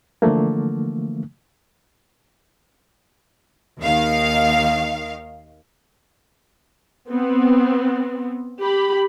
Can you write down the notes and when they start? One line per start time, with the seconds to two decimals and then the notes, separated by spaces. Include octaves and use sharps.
0.22 D3 E3 F3 A3 A#3
3.81 D#2 D#3 F5
7.10 B3 C4
8.60 G4 B5